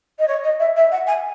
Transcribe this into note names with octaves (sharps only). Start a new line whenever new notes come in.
D#5
C#5
D#5
E5
E5
F#5
G#5